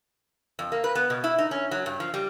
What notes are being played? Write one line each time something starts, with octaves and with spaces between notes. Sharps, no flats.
F2
A#3
B4
B3
B2
E4
D#4
C#4
F#3
G2
F3
G3